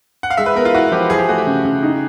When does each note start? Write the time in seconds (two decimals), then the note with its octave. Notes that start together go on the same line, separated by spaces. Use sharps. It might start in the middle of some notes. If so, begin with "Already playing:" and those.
0.23 F#5
0.30 F5
0.37 G#3 E5
0.46 B4
0.55 B3 A#4
0.65 F4
0.73 E4 F#4
0.92 F3 G4
1.10 F3 G#4
1.19 G4
1.29 A3 F#4
1.38 G4
1.47 C#3
1.65 C#3
1.83 D#4